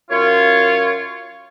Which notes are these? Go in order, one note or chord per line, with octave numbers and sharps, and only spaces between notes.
F#2 F4 C#5